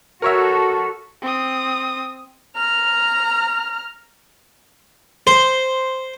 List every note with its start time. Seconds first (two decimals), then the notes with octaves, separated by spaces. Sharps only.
0.22 F#4 A4 A#4 C#5 E5
1.22 C4 D#6
2.56 A#5 F6
5.27 C5